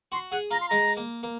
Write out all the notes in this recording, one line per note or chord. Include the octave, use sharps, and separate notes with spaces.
F#4 C6
G#4 F#5
F4 A#5
C6
G#3 A#5
A#3
A#3